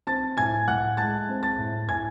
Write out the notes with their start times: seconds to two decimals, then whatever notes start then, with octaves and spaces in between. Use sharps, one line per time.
0.07 C4 A5 A6
0.37 A2 G#5 G#6
0.68 A2 F#5 F#6
0.97 G#3 A5 A6
1.29 C4
1.43 A5 A6
1.58 A2
1.89 A2 G#5 G#6